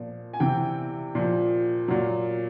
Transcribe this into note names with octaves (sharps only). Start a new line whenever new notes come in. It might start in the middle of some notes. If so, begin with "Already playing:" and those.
Already playing: A#2 F3
G#5
C3 E3 G5
A#2 F3
A#2 F#3